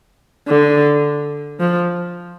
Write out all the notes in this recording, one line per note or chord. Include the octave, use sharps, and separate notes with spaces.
D3
F3